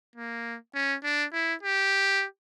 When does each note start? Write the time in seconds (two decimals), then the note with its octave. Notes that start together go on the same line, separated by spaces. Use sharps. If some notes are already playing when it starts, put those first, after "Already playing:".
0.16 A#3
0.75 C#4
1.04 D4
1.33 E4
1.63 G4